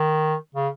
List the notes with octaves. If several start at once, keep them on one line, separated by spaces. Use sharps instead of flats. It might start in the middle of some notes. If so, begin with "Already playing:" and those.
Already playing: D#3
C#3